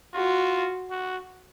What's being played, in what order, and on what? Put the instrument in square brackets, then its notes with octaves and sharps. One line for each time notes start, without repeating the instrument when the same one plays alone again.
[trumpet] F4 [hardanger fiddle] F#4
[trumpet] F#4